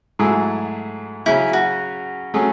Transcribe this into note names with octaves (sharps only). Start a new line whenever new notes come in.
G#2 F#3 A3 E4 G#4
C#3 F#3 C#4 E4
F#4
F#3 A3 C#4 G#4